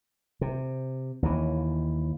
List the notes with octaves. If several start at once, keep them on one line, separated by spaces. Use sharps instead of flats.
C3
D#2 E3